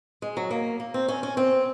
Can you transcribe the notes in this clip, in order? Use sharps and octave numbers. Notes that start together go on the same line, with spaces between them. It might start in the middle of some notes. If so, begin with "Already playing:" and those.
G#3
F#3
A#3
A#3
C4
C#4
C#4
C4